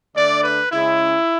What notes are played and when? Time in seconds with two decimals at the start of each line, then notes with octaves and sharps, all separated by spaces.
0.15 D3 A3 D4 D5
0.44 B4
0.72 C#3 G#3 C#4 E4